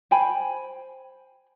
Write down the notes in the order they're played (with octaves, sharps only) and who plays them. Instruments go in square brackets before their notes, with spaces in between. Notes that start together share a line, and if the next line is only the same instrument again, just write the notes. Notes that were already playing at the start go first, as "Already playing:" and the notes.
[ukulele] C5 G5 G#5 B5